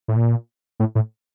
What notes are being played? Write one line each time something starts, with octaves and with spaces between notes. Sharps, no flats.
A2
A#2
A2
A2